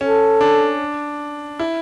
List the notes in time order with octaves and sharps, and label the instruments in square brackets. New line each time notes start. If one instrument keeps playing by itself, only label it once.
[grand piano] C#4 [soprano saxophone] A4
[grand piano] D4
E4